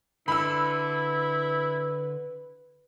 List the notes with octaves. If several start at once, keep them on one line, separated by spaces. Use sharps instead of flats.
D3 E4 B4 B5 E6